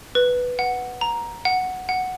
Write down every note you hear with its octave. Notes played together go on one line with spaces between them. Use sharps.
B4
F#5
A#5
F#5
F#5